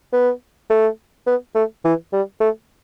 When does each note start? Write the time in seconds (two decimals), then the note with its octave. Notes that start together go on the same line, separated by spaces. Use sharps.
0.13 B3
0.70 A3
1.27 B3
1.55 A3
1.85 E3
2.13 G3
2.41 A3